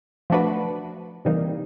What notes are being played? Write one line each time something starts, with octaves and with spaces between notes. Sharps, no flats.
F3 A3 D4 F#4 B4
C3 E3 G3 A#3 D#4